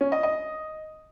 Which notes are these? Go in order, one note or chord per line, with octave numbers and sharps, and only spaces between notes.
C#4
D#5
D#5